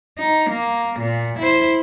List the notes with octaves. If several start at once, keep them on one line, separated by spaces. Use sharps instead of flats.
D#4
A#3
A#2
E4 C5